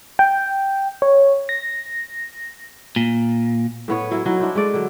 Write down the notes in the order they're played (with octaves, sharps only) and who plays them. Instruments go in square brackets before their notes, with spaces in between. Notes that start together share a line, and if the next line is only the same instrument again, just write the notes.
[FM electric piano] G5
C#5
A#6
[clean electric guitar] A#2
[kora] A2 B3 C#5
F#3 E4 A#4
F#3 D#4 E4
D4 E4 C5
G#3 A3 D5
D3 F#3